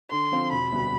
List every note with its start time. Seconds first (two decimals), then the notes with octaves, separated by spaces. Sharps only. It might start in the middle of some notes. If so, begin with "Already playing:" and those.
0.11 D3 C6
0.32 F3 C4 F4
0.52 E1 B5
0.72 D2 C3 G3 B3